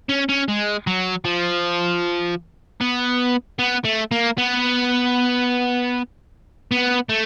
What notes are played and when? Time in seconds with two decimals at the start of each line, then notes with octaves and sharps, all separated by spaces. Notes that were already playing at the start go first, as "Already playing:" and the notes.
0.09 C#4
0.29 C#4
0.48 G#3
0.87 F#3
1.25 F3
2.81 B3
3.59 B3
3.85 A3
4.11 A#3
4.38 B3
6.72 B3
7.09 A3